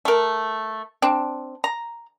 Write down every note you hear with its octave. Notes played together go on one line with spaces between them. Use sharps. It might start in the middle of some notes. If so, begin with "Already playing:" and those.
A3 A#4
C4 D4
A#5